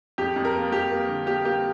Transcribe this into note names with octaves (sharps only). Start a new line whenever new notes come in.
F2 G4
F2
A#4
A#3
F2 G4
A#3
D3
A#3 G4
A#3 G4